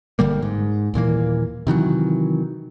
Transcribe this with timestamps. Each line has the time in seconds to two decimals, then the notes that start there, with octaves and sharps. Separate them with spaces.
0.19 G1 D3 G3 A#3
0.42 G#2
0.94 D#1 A#2 E3 A#3
1.67 C3 D#3 E3 F#3